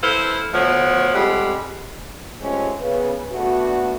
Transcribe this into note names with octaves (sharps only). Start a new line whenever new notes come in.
E4 A4 B4 C5 F5
D2 F3 A3 B3 C#5
F2 G3 G#3 F#5
G#3 A3 C4 C#4 F4 G4
C#3 B3 B4
A3 B3 D4 F#4